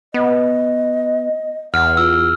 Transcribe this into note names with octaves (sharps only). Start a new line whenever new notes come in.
B3 D#5
E2 F#5 F6
F4 E6